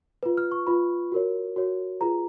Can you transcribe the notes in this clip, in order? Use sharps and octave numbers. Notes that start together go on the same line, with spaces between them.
F4 B4
F6
C#6
F4 B4 B5
F#4 A#4 C#5
F#4 A#4 C#5
F4 G#4 B4 A#5